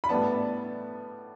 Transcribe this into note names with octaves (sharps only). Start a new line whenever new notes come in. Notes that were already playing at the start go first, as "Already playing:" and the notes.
B5
A2 G3 B3 D4 A5